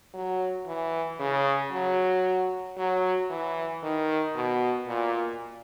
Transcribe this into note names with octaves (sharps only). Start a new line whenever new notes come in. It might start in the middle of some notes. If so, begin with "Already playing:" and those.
F#3
E3
C#3
F#3
F#3
E3
D#3
B2
A#2